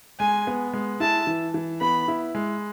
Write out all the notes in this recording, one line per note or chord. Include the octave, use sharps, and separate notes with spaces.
G#3 G#5
B3
G#3
E4 A5
E3
E3
B3 B5
E4
G#3